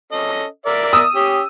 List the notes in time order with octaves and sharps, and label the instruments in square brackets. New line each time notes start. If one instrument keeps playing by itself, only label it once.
[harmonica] C#4 A4 D#5
A#4 D5 E5
[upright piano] D#6 E6
[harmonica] C#4 G4